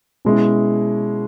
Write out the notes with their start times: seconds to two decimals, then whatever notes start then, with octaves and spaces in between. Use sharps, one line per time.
0.25 B2 G#3 C#4 E4